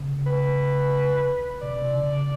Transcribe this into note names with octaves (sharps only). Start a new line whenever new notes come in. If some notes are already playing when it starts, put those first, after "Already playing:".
Already playing: C#3
B4
C3 D5
C#3